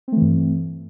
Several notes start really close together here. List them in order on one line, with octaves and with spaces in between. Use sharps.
C4 A3 E3 G2